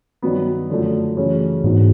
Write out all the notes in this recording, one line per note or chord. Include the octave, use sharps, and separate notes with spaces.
G2 D#3 F#3 B3
F#2 D3 F3 A3
F#2 C#3 E3 A3 C#4
E2 G#2 B2 G#3